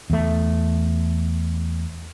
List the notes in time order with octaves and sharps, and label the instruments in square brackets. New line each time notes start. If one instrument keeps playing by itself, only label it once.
[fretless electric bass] E2 A3